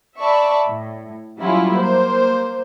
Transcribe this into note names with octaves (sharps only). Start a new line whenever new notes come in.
D5 E5 A5 B5 C#6
A2
F#3 G3 C#4 E4 F4
A#3 C5